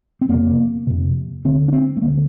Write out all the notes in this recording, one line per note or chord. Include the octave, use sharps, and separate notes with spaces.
C4
F2 C3 A#3
F2 C3
D2 D3 C4
D4
C4
A3
D2 D3 A#3